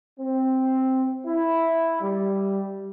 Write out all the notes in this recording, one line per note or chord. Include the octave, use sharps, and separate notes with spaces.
C4
E4
G3